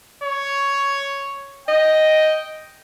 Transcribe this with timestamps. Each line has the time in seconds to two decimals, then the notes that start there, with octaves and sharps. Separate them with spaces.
0.23 C#5
1.68 D#5 G5